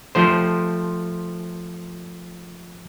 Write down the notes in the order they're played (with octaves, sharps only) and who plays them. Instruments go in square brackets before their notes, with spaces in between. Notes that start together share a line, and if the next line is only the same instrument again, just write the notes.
[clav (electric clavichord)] F3 A3 C5